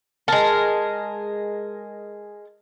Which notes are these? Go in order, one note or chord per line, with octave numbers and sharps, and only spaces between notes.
G#3 A#4 A5